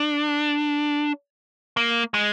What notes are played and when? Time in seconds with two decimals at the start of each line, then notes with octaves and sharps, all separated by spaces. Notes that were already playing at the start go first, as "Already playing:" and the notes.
Already playing: D4
1.77 A#3
2.14 G#3